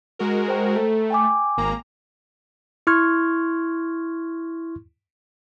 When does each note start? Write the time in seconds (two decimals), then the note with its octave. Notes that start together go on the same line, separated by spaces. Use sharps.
0.19 G#3 F#4 A#4
0.48 C5 G5 A#5
0.75 A3 A4 A#5
1.10 G5 G#5 D6
1.57 G#1 A#3 A#5
2.87 E4 C6 C#6 F6 G#6